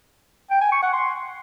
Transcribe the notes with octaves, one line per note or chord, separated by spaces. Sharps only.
G5
G#5
C#6
F#5
C6